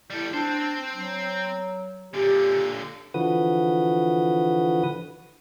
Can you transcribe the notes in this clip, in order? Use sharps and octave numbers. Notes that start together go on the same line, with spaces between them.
G3 E4 A4
C4 D4 C5
F#3
A#2 D3 G4
D3 E3 F3 F#4 B4 D#6